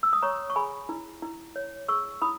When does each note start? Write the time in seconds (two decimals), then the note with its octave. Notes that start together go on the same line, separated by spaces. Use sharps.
0.03 E6
0.13 D#6
0.22 C#5 A#5 C#6
0.50 C#6
0.56 G#4 G#5 B5
0.89 E4
1.22 E4
1.56 C#5
1.88 G#4 C#6 E6
2.22 E4 B5 D#6